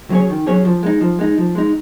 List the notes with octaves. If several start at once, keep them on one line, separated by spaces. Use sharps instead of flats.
F#3 C#4 G#4 C#5
D#3
F#3 C#4 G#4 C#5
F3
G#3 D#4
F3
G#3 D#4
F3
G#3 D#4